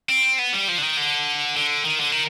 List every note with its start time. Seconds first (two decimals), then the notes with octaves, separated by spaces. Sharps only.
0.09 C4
0.39 B3
0.53 G3
0.68 F3
0.78 D3
0.82 D#3
0.97 D3
1.57 D3
1.85 D#3
2.00 D3
2.12 D#3